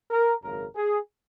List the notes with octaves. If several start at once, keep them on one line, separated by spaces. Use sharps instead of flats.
A#4
G#1 F#2 C#3 A#4
G#4